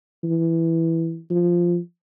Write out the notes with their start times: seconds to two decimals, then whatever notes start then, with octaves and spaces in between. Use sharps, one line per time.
0.24 E3
1.30 F3